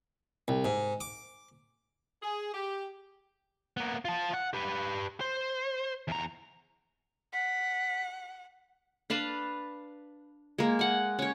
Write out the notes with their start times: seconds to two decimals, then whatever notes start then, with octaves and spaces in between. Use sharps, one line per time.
0.48 C2
0.65 G#2
1.01 D6
2.22 G#4
2.54 G4
3.77 A#3 B3
4.05 F4 A5
4.34 F#5
4.53 G4 B4
5.21 C5
6.08 E2 A#5
7.33 F#5 B6
9.10 D4 B4 F5 A5
10.58 G#3 A#3
10.79 F#5 G#5
11.19 C#4 C#5